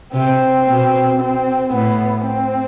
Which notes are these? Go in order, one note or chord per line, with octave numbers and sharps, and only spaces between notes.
C3 C4
B2
C4
A2 B3
C4